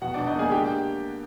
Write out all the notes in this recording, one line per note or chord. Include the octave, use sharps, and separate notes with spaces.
B2 F#4 F#5
B2 D4 D5
D#4 D#5
A#3 G#4 G#5
D3 G4 G5